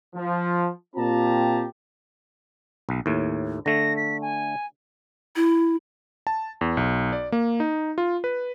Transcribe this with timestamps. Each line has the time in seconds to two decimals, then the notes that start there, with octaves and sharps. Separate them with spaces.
0.15 F3
0.96 A#2 C4 F4 G4 A5 A#5
2.89 B1
3.06 D#2 A2
3.66 D3 A3 A#6
3.97 B6
4.22 G#5
5.36 E4
6.27 A5
6.61 E2
6.77 B1
7.13 D5
7.32 A#3
7.60 D#4
7.98 F4
8.24 B4